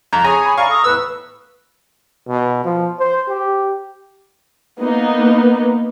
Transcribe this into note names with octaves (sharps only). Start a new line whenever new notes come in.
F2 A#5
G#4 C#5 G#5 A#5
B5
D5 F5 G#5 A#5 C#6
A4 A#5 D#6
E2 A2 B4 E6
B2
F3
C5
G4
A#3 B3 D#4